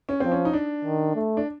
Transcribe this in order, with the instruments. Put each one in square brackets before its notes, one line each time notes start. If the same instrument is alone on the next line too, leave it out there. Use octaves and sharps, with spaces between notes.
[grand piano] C#4
[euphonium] F3 [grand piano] C4
[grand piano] C#4
D#4
D4
[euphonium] D#3
A3
[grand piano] D4